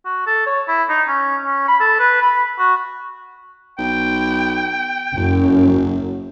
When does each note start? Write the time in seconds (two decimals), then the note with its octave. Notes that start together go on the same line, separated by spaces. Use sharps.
0.05 F#4
0.27 A4
0.46 C#5
0.68 E4
0.89 D#4
1.08 C#4
1.45 C#4
1.68 B5
1.80 A4
1.99 B4
2.22 B5
2.59 F#4
3.78 B1 G5
5.16 F#1 F#2